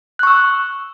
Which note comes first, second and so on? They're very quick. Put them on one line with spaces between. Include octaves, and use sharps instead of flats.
F#6 C#6 E6